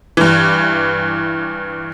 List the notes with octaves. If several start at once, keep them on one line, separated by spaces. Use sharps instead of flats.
G2 E3